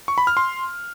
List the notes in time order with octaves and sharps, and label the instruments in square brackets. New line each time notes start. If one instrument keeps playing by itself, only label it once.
[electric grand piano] C#6
B5
F6
C6